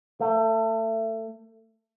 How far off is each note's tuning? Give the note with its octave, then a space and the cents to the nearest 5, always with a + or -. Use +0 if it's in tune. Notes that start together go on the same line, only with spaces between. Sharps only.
A3 +25